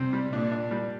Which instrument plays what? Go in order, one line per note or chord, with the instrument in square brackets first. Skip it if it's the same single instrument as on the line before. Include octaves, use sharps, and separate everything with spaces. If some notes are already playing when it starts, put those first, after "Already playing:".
Already playing: [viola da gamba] C3 [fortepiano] G3 C4
[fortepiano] G3
[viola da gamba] A#2 [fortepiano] D4
[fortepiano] D4
G3